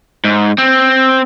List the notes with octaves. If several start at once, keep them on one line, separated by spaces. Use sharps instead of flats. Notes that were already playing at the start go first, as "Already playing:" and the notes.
G#2
C4